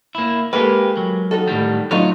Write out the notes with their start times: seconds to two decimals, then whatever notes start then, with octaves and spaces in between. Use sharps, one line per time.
0.15 A#3 E4
0.53 G#3 A#3 G4 A4 B4
0.97 F#3
1.31 D#4 F#4 A4
1.48 A2 D#3 G3
1.91 F#3 A3 D#4 F4